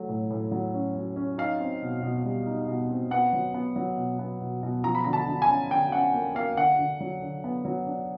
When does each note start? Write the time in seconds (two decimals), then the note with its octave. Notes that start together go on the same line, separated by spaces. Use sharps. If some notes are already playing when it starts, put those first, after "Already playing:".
Already playing: F#3 A3
0.09 A2
0.30 A2
0.51 F#3
0.74 C#4
0.95 F#3
1.16 C#4
1.38 D#4 F5
1.60 C4
1.82 B2
2.03 B2
2.25 G3
2.47 D#4
2.68 B2
2.90 C4
3.11 B3 F#5
3.33 F#3
3.54 B3
3.76 F#3
3.97 B2
4.19 B3
4.41 B2
4.63 B2
4.84 F3 A#5
4.95 B5
5.04 D3 A#5
5.13 A5
5.27 D3
5.42 G#5
5.48 C#4
5.71 D3 G5
5.92 C#4 F#5
6.14 A#3
6.35 A#3 F5
6.57 D3 F#5
6.79 D3
7.00 F#3
7.22 D3
7.44 B3
7.65 F#3
7.87 D4